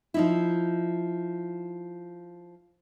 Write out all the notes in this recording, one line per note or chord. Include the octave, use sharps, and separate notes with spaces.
F3 D#4 E4